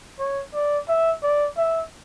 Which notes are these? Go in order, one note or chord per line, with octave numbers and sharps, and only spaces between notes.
C#5
D5
E5
D5
E5